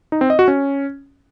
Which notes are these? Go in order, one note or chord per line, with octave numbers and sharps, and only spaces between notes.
D#4
C4
D#5
F#4
C#4